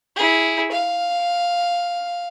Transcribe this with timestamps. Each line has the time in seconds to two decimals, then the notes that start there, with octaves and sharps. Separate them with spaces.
0.16 E4 G#4
0.71 F5